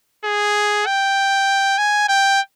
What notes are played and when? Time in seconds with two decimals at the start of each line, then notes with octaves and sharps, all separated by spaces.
0.25 G#4
0.86 G5
1.78 G#5
2.08 G5